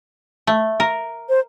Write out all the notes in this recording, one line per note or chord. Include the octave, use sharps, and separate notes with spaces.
A3
A#4
C5